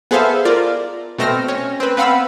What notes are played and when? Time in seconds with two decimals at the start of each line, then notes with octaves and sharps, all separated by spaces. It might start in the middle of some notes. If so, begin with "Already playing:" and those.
0.11 B3 G#4 A4 C5 E5 F5
0.45 F4 A#4 D5
1.18 B2 A3 C4 F6 A#6
1.48 C#4
1.80 C4 B4
1.97 B3 C4 F5 F#5 B5 E6